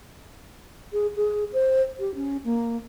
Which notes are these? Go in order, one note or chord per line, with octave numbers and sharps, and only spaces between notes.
G#4
G#4
C5
G4
C#4
A#3